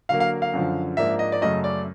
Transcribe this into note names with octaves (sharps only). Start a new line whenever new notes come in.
D3 F#3 A#3 F5
F5
F5
F#2 D3 F3
G#2 F3 A#3 D4 E5
D#5
D5
F#2 C#3 F#3 A3 D#5
D5